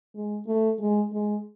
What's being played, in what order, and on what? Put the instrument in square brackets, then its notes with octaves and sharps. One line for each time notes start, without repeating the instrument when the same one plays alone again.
[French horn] G#3
A3
G#3
G#3